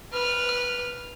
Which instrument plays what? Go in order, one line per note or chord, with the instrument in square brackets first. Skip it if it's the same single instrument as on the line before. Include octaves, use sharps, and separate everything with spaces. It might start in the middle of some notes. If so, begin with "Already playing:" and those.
[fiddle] B4 F6